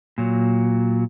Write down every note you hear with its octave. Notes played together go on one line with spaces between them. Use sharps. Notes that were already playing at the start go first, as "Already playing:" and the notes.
A#2 F#3